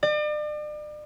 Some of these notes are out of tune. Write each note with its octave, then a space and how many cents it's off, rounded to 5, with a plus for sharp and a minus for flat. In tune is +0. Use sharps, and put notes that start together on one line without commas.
D5 +40